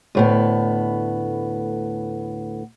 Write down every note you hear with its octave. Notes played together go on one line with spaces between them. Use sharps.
D2 A2 B3